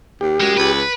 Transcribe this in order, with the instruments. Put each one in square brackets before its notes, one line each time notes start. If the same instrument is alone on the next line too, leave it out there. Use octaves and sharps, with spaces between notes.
[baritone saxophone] D#2 [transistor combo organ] G4
[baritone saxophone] F#2 [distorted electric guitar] G#3
[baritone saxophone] C#2 [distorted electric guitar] B4